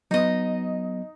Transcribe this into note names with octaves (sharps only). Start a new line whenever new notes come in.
F#3 B3 D#4 D#5